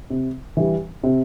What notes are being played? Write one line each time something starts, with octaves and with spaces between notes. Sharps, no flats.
C3
E3 G3
C3